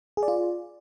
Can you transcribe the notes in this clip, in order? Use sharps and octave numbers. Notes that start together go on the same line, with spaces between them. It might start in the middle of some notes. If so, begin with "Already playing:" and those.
G#4
D5
F4